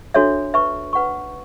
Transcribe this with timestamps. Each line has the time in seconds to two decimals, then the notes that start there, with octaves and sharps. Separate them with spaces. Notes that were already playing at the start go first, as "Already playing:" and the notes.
0.14 D4 F#4 A4 C#5 E5
0.54 B4 E5 A5 C#6
0.93 B4 F#5 C#6